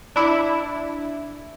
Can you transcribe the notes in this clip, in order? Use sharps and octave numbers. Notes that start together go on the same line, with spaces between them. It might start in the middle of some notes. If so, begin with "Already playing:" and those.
D4 E4